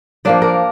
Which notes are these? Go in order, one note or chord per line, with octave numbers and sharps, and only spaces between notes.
F3 A#3 D4 D5
A#4